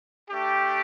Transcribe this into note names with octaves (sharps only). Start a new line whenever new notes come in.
A3 D4 G4